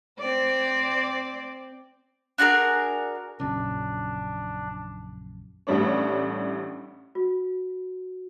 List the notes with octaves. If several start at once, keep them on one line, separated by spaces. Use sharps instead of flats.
C4 C5 D5
D4 F#4 G#4 A#4
A#1 F#2 C#3 D4
A1 A2 G3 D4 C#5
F#4